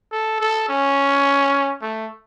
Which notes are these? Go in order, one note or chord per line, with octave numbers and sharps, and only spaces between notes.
A4
A4
C#4
A3